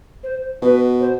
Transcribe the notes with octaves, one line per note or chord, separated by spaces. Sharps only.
C5
B2 B4
C5